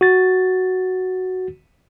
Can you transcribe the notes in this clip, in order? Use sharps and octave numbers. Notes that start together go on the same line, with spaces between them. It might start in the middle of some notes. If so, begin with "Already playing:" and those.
F#4 A6